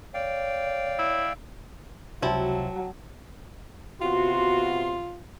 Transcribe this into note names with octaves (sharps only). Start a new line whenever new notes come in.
C#5 D5 F5 G5
E4
C#2 C3 F3 F#3 E4 F#4 G5 A5
C3 B3 F4 F#4 C6